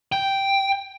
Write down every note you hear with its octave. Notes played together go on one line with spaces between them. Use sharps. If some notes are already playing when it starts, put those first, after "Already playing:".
G5